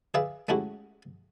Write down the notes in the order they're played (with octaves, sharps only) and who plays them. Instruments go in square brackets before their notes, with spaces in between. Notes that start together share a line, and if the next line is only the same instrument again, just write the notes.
[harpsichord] G#4 B4 D5 E5 F5
G#3 A3 C#4 E4 F#4 G4